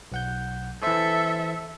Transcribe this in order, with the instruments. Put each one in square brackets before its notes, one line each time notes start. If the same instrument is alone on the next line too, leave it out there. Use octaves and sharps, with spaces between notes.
[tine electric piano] B1 F#5 G6
[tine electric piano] E3 C5 [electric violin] A4 E5